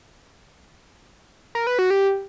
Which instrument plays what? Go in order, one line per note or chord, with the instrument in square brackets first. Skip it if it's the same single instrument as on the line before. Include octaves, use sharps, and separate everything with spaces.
[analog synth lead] A#4
B4
F#4
G4